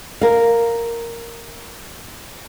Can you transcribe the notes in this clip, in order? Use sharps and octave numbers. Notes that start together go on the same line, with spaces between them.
A#4 F5